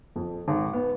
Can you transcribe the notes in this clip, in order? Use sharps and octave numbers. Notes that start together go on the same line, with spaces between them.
F2
G#1
B3